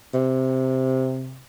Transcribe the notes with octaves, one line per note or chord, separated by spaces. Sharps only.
C3